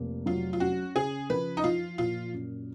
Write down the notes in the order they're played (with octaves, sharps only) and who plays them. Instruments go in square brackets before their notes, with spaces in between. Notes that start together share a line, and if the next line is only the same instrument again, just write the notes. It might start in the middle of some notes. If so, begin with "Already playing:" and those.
Already playing: [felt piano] F1 A#3
[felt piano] F#3 [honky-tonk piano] F4
[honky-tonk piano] F4
[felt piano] C#4 [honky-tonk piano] F#4
[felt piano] C#3 [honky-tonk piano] G#4
[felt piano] F3 [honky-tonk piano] B4
[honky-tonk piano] D#4
[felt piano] F3 [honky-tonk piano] F4
[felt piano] A#2 [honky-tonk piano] F4
[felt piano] F#2